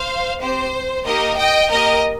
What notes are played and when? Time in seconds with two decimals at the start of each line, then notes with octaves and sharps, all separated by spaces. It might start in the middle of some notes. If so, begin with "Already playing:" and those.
Already playing: C5 F5
0.41 C4 G4 C5
1.06 A#3 D#4 G4 A#4 D#5
1.38 D#5 G5
1.70 A#3 G4 A#4 D#5